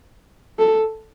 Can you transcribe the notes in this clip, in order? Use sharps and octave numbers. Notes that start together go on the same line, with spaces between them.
A4